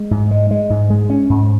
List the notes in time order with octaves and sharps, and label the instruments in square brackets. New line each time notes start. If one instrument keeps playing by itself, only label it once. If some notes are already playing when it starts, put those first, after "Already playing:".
Already playing: [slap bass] G#3
G#2
G#3
G#3
G#2
G#3
C#4
G#2